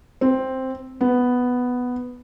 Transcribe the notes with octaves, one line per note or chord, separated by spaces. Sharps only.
C4
B3